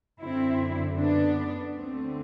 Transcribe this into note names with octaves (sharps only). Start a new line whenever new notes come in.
F#2 D3 C4 E4
B3 D4
D2 D3 A3 C4